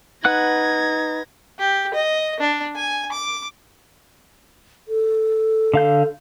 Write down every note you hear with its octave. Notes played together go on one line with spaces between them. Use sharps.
D#4 B4 F#5 F#6 G#6 A#6
G4
D#5
D4
G#5
D6
A4
D3 F5 G6